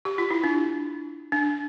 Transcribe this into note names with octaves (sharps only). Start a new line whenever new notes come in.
G4
F4
E4
D4
D4